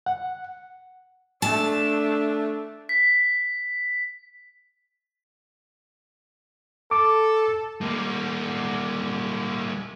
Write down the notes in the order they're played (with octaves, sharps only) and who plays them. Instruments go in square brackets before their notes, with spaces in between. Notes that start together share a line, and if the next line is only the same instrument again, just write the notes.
[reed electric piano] F#5
[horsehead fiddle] A3 D4 [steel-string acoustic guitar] A5
[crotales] B6
[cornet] A4 [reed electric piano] D6
[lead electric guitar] G3 A#3